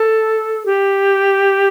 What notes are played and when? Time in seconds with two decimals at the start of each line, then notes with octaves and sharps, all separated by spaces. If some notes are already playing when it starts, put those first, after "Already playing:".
Already playing: A4
0.66 G4